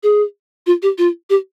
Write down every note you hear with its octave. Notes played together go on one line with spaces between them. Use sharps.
G#4
F4
G4
F4
G4